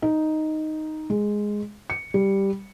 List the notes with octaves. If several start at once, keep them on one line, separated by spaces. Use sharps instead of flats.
D#4
G#3
C#7
G3